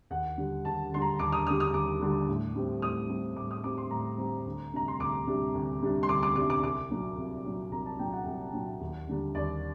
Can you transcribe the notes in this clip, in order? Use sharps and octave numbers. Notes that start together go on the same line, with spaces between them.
D#2 F#5
D3 G3
D#2 A5
D3 G3 C6
A#5
D#2 D6
D#6
D3 G3 D#6
D#6
D#2 D6
D3 G3
A2
G3 C4
A2 D#6
G3 C4
A2 D6
D#6
G3 C4 D6
C6
A2 A#5
G3 C4
D2
C3 G3 D4 A#5
C6
D2 D6
C3 G3 D4
D2
C3 G3 D4
C6
D2 D6
D6
C3 G3 D4 D6
D6
C2 D6
A#2 F#3 A#3
C2
A#2 F#3 A#3
C2 A#5
A5
A#2 F#3 A#3 G5
F#5
C2
A#2 F#3 A#3
D#2
D3 G3 A#3 D4
D#2 D5